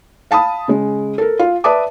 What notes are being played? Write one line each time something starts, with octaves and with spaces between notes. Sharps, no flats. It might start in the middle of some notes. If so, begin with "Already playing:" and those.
F5 A5 B5 D#6
C#3 G#3
A4 A#4
F4
B4 D5 E5 A5 D6 D#6